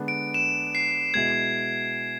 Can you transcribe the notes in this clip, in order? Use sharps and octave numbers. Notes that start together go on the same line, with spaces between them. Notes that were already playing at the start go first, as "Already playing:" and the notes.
Already playing: D3 G#3 B3 D4
D7
E7
C7
B2 G#3 B3 E4 G#6